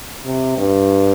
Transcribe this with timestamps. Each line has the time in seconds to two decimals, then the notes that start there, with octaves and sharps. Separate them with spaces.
0.25 C3
0.58 G2